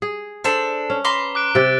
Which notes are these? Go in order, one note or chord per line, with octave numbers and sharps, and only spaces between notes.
G#4
D4 A4 C5
C#4
B4 A#5 C6 D6 G7
D6 F#6 D7
C3 G4 D6 A6 D7